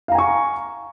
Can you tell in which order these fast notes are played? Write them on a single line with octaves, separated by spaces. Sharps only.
F5 A#5 G#5 C#6